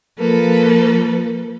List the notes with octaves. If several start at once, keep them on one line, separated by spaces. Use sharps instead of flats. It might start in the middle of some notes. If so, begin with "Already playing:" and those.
F3 A#3 A4 B4